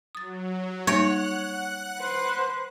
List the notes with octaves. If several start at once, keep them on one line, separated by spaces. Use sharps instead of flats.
F#3 D#6 A6
G3 A#3 D#4 C#5 F#5 F#6
B4 C5